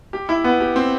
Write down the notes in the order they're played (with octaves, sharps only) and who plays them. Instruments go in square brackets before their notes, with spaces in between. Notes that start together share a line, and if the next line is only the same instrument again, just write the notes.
[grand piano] G4
E4
B3
G4
C4